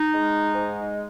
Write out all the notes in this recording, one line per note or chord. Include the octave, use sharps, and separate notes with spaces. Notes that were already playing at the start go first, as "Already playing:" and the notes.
Already playing: D#4
G#3
G#2